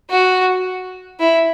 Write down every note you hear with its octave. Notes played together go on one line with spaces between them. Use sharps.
F#4
E4